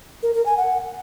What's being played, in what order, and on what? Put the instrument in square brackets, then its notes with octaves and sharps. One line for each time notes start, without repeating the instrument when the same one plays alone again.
[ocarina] A#4
A#4
G#5
F#5